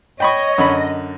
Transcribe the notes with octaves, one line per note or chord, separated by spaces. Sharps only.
C#5 D#5 G5 B5 C#6
F#2 D3 B5